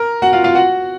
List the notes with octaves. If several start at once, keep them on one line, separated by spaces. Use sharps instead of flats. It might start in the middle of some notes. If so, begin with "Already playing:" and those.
Already playing: A#4 A#5
F#4 F#5
F4 F5
F4 F5
F#4 F#5